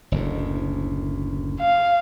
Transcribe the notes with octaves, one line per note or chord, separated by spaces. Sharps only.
F#1 D2 A2
F5